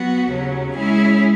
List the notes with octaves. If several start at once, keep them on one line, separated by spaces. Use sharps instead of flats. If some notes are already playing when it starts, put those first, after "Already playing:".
Already playing: F#3 B3 F#4
D#2 C#3 F#3
G#3 C#4 E4 G#4 C#5